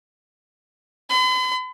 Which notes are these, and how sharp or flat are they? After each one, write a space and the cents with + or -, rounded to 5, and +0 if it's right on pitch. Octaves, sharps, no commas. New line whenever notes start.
B5 +45